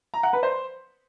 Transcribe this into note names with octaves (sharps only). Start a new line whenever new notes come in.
A#5
F#5
B4
C5